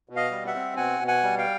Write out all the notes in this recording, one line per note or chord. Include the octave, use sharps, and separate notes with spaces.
B2
D#5 F5
G3
E5 F#5
C4
B2 F#5 G#5
B2
F#5 G#5
G3
F5 G5